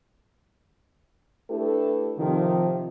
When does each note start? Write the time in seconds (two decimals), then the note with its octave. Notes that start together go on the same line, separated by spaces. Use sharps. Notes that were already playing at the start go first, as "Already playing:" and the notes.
1.50 A3 D4 E4 G4 A4 B4
2.17 C3 D#3 F3